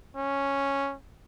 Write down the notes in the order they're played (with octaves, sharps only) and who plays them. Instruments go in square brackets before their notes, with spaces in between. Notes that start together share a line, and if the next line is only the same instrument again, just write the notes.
[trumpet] C#4